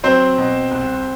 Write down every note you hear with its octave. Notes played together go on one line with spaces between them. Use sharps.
F#3 C4 C5
B2
C2